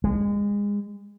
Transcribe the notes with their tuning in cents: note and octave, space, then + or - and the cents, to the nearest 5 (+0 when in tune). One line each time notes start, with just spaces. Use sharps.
G#3 -30